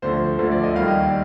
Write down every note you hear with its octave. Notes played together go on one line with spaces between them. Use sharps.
D2 D3 F3 C5
D2 D3 F3 C5
D5
D#5
D#2 D#3 G3 F5
D#5
D5